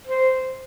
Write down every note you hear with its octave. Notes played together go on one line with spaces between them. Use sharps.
C5